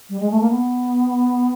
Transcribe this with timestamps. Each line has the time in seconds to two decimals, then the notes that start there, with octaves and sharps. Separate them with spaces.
0.09 G3
0.20 G#3
0.31 A3
0.40 A#3
0.50 B3